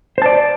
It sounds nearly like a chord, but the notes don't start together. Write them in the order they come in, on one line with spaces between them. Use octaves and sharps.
C5 A5 D5